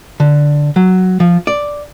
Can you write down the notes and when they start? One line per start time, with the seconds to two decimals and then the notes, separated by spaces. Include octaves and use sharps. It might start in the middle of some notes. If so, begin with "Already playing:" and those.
0.20 D3
0.76 F#3
1.20 F3
1.47 D5